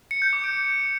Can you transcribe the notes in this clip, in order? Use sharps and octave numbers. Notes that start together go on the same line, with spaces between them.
C#7
G6
D6
D7